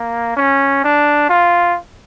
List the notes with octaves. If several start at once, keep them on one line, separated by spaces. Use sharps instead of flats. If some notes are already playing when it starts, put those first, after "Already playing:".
Already playing: A#3
C#4
D4
F4